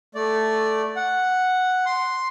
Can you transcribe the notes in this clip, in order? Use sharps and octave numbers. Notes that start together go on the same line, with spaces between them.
A3 D5
F#5
C6